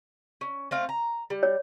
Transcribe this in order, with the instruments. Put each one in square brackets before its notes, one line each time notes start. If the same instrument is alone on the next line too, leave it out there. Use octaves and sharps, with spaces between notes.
[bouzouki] C#4
A3 C4 F5
A#5
G3
[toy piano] C#5